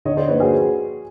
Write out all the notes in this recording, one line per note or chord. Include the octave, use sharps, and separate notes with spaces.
D3 C#5 D#5
C5 D5
F3 A#3 D#4 B4 C#5
F#4 G#4